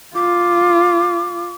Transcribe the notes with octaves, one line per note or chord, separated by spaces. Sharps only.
F4 D6